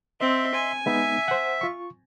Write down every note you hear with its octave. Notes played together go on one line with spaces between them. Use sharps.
C4 D#5 E5 C6
G#5
G#3 B3 D#4 E5
C5 F#5
F4 C#6